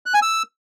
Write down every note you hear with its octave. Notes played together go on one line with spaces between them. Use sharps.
F#6
G#5
E6